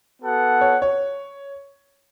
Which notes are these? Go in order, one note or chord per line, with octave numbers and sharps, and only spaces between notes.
B3 F#4 A4 F#5
C#5
C#5